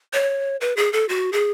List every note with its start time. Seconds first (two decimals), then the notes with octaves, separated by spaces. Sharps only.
0.13 C#5
0.61 B4
0.77 G#4
0.93 A4
1.09 F#4
1.33 G#4